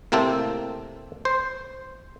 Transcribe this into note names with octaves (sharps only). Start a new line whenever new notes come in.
A2 C3 A#3 C4 A4
C5